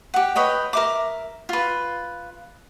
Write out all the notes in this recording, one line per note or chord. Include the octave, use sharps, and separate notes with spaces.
G4 F#5
B4 C#5 D#5 G5
A#4 E5 D6
F4 B4